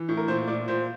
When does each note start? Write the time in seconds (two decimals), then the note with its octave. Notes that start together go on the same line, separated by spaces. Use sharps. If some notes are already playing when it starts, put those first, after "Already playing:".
Already playing: E3
0.09 A2
0.17 A#4
0.28 A#2 C5
0.47 A#2 D5
0.68 A#2 C5